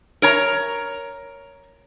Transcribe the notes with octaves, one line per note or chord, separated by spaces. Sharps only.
A#4 C#5 A#5